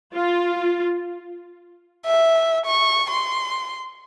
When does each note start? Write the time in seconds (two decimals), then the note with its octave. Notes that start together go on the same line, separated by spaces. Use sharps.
0.13 F4
2.06 E5
2.66 C#6
3.11 C6